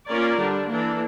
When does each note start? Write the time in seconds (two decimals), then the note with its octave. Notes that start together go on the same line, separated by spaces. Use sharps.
0.10 A#3 C#4 F4 A#4 D5
0.40 D3 G3 D4
0.71 E3 A#3 D4 A4